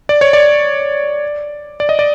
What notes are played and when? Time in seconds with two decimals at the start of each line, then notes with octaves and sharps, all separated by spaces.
0.09 D5
0.21 C#5
0.33 D5
1.80 D5
1.89 D#5
1.99 D5